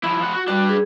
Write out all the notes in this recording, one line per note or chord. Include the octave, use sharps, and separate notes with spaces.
F3 E4 B5
F3 F#5
F#4
G3 D4 F#4 B4
G#4